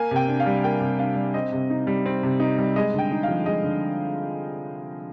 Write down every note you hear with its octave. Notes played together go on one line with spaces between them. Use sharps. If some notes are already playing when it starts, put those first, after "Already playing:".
Already playing: A#3 G#5
C3 G5
D4
F5
G3
A#3 G5
C3
D4 F5
G3
C4 D#5
C3
D#4
G3
C4
C3
D#4
G3
G#3 D#5
D3 G5
D#4
F5
F3
G#3 D#5
D3